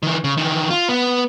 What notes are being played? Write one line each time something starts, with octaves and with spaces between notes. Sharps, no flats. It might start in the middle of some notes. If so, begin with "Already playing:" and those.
D#3 E3
C#3
D#3 E3
F4
B3